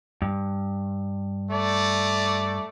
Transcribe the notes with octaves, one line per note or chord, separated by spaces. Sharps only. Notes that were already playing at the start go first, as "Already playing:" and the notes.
G2
A3 D5